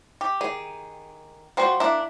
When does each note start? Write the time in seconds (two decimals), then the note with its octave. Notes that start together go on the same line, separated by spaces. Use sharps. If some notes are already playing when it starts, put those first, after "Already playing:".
0.21 G4
0.41 D#3 G#4
1.57 F3 G3 F#4 C5 G5
1.80 A#3 D4 E4 E5